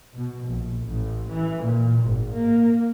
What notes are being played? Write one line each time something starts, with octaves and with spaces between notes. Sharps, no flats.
B2
A#1
A1
E3
A#2
G#1
A#3